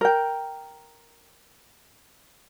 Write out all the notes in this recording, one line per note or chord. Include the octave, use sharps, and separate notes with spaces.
A#4 G5